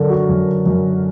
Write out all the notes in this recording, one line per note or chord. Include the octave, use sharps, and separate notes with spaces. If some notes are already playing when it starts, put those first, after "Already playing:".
Already playing: F#2 D3 A4 A#4
F#4
F#2
F#2